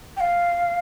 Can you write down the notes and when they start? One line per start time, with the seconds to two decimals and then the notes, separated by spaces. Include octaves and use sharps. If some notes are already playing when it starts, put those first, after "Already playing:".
0.17 G5
0.20 F5